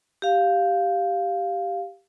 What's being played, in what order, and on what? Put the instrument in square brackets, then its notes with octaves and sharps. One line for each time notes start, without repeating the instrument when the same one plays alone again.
[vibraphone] G4 F5